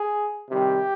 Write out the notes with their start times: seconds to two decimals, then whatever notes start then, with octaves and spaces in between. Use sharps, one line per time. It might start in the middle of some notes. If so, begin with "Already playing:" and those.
Already playing: G#4
0.49 C3 D#3 G3 G4